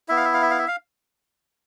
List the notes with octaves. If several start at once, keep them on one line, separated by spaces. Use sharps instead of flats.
B3 E4 E5
F5
E5
F5
E5
F5
E5
F5